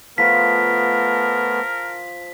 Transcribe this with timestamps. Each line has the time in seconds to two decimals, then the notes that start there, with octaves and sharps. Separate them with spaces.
0.18 F3 A3 B3 F4 A#4 B6